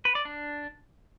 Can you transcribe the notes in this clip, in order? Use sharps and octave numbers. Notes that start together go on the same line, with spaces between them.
B4
D5
D4